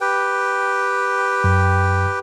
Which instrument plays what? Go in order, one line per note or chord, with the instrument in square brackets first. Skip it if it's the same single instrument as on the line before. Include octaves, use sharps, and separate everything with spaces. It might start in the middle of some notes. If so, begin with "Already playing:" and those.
[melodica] G4 B4 G5
[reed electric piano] F#2